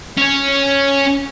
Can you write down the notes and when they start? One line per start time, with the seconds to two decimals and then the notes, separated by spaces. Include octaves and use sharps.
0.18 C#4 C#5